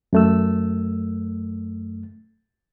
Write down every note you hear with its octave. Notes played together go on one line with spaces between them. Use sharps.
F#2 A3 E6